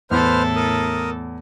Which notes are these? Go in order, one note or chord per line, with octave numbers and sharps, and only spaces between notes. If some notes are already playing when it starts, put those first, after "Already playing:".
E2 A2 A4 B4 C5 F6
A#4 D#6